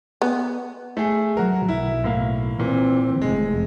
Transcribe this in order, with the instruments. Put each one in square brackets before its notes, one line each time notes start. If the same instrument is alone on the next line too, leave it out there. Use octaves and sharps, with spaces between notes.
[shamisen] B3
[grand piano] A3 G#4
[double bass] F#3 [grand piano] F#4 A#4
[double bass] B1 [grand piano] E4
[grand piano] A2 A#3 F5
[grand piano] A#2 [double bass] E3 C4
[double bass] F1 F2 [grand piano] C3 G#3